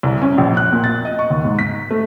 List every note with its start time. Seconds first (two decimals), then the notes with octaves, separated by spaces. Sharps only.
0.03 C2
0.22 C#4
0.38 A#1
0.57 F#6
0.72 A#2
0.84 A6
1.05 D#5
1.19 C#6
1.30 D#2
1.45 G#2
1.59 B6
1.91 A3